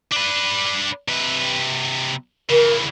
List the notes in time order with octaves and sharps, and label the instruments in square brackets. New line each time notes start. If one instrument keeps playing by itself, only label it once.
[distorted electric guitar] D4 B4
C3 B4
[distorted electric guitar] C#3 E3 [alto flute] A#4